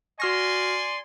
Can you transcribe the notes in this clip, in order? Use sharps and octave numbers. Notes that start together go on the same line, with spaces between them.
F#4 D5 G#5 C6 F6 A#6